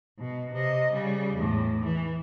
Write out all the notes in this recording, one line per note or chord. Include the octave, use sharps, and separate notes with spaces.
B2
C3 D#5
C#3 G3
E2 A2
E3